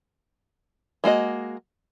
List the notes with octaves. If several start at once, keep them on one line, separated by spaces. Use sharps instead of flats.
G#3 A#3 F#4 D#5